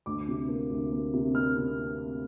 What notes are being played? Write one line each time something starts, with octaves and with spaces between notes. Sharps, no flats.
D2 D6
C3
A#3
D2
A#3
C3
A#3 F6
C3